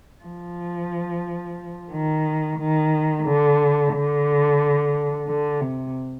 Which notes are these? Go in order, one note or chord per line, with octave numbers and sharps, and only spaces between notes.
F3
D#3
D#3
D3
D3
D3
C3